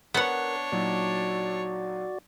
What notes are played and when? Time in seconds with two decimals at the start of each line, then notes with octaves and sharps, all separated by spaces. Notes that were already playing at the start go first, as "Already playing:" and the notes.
0.14 B3 D4 A#4 C#5 F#5
0.72 A#2 F#3 D#4 F#4 D5